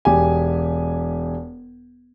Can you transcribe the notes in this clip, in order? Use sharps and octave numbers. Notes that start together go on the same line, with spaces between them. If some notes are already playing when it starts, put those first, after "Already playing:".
E1 G4 G#5